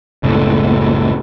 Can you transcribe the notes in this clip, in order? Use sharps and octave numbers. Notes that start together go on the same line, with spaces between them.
F#1 C#2 A2